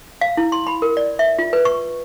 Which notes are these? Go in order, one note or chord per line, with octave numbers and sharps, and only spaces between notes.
F5
E4
C6
B5
A#4
D5
E5
F4
B4
C#6